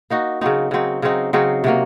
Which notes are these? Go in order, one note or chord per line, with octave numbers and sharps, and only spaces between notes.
A#3 D#4 F#4
C#3 F#3 C4 D#4
C#3 F#3 C4 D#4
C#3 F#3 C4 D#4
C#3 F#3 C4 D#4
C3 F#3 A#3